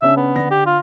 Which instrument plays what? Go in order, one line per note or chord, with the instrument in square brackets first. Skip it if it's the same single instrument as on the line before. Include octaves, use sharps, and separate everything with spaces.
[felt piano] C#3 C#4 D4 [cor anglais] E5
[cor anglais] B3
[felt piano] D3 A#6
[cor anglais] G4
F4